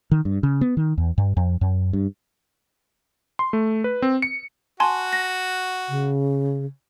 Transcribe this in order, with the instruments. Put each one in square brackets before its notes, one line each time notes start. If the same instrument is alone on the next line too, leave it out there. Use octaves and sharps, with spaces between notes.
[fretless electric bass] D#3
G2
C#3
B3
D#3
E2
G2
F2
F#2
G2
[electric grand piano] C6
A3
B4
C4
C#7
[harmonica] F#4 [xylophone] G#5 A5 C6
[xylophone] A#6
[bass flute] C#3